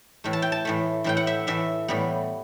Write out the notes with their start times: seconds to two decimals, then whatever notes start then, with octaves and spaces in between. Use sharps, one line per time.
0.24 A2 E3 A3
0.33 A5
0.42 G5
0.52 A5
0.65 A2 E3 A3
1.04 A2 E3 A3 G5
1.17 F#5
1.27 E5
1.47 A2 E3 A3 E5
1.88 A2 E3 G3 B3